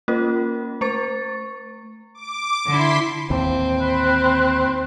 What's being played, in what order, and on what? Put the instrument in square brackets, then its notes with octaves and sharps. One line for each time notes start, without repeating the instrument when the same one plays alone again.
[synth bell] A#3 C#4 F4 A#4
A3 C5 C#6 A6
[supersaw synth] D6
[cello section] D3 E4 [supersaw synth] C6 B6
[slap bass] D#2 A2 E3 [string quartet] C4
[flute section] B5 C6 F#6